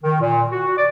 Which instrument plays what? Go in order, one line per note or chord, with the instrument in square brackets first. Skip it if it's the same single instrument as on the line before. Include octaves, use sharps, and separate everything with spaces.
[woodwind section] D#3
A#2
F#4
D5